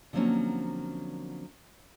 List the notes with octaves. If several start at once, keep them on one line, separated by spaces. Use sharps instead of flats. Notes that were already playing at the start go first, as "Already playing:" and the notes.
D3 F3 F#3 A#3 C4 C#4